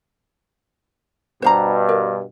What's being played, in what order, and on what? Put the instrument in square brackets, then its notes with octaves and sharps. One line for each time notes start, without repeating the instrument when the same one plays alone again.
[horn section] G2 B2 [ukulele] C5 F5 A#5
[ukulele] A#4